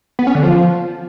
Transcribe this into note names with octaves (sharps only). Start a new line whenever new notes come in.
B3
C#4
D3
F3